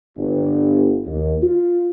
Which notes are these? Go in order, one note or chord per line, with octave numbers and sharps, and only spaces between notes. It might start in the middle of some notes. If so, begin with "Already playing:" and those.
G1
D#2
F4